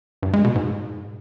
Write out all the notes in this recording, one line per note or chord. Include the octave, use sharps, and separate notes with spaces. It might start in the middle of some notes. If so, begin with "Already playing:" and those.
G2
G#3
B2
G#2